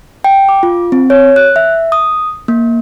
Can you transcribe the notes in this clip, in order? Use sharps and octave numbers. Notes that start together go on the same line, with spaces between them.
G5
D6
F4
C4
C#5
F#6
E5
D#6
A#3